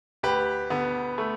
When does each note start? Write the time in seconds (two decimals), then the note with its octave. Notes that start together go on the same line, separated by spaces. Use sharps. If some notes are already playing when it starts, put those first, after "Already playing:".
0.23 D2 G4 B4
0.70 D3 B3
1.18 A3